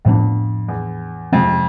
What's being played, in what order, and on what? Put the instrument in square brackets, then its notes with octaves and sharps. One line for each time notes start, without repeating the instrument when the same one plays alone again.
[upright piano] F2 [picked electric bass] A2 F3 B3 D4
[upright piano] E2
[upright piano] F2 [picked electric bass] C3 G#3 C4